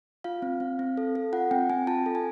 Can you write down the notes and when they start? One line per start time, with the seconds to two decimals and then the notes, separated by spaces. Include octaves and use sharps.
0.24 F4 F5
0.42 C4
0.60 C4
0.79 C4
0.97 A4
1.15 A4
1.33 F4 F#5
1.51 C4 G5
1.70 C4 G#5
1.87 F4 A5
2.06 A4
2.15 G#5